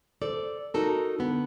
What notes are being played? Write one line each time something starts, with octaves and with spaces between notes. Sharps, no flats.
A4 C5 D5
D#4 F#4 A4 A#4
D3 B3